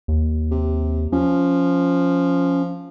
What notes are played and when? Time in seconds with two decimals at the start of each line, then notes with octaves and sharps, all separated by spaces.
0.08 D#2
0.51 C3
1.12 F3 C#4